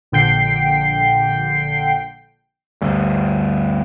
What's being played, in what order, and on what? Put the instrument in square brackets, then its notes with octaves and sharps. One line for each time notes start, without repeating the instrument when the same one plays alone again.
[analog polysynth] A#1 D3 G5 C7
[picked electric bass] D2 G2